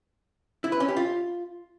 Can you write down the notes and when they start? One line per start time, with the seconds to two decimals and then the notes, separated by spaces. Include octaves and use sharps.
0.64 E4
0.72 B4
0.80 C#4
0.88 G4
0.97 F4